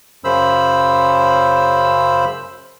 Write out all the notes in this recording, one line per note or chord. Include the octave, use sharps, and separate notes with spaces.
F#2 C#3 C5 B5 E6